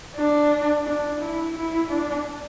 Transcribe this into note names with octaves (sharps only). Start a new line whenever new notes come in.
D4
D4
E4
E4
D4